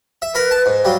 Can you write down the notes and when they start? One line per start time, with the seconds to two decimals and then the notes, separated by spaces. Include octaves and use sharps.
0.22 E5
0.35 A#4 B4 B5
0.51 A5
0.66 G#2
0.85 F#3 G3 F5